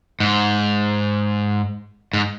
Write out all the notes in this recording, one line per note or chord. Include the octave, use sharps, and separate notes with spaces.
G#2
G#2